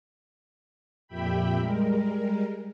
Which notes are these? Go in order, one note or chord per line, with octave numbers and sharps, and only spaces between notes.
F2 A#2 G4 E5 G5 B5
G3 G#3 A#4